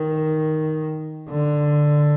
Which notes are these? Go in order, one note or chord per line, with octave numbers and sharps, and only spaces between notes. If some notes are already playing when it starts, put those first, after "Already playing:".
Already playing: D#3
D3